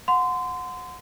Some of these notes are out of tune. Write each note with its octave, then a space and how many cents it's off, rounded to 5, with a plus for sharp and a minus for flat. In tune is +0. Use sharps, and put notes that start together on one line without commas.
F#5 -25 C6 -25